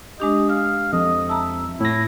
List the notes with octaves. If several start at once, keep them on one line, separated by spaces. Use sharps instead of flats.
G#3 D4 G4 D#5
F5 F6
F2 D#5
E5 A5 A#5
A2 E4 A#6